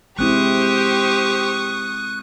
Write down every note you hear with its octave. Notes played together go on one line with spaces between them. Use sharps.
G#3 C4 E4 G4 C5 C#6 D#6 F#6